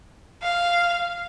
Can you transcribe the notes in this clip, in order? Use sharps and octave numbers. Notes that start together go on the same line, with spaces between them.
F5